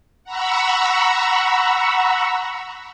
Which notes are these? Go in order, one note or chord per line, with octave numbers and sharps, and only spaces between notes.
F#5 A#5 B5 C#6 E6